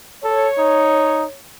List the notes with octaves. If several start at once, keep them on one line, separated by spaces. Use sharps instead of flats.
A4 C#5
D#4